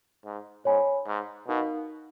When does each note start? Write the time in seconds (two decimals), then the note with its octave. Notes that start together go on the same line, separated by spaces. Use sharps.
0.25 G#2
0.65 G#2 C#5 G#5 B5
1.06 G#2
1.48 B2 D#4 A#4 F5